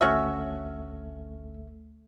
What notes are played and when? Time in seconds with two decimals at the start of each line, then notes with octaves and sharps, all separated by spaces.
0.01 G#1 D2 A3 C#4 F#4 E5